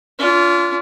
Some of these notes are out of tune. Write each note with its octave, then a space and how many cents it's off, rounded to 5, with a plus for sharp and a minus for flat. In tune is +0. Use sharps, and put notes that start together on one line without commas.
D4 -45 F4 -10